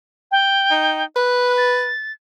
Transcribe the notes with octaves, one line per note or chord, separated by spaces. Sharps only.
G5
D#4
B4 F#6
A6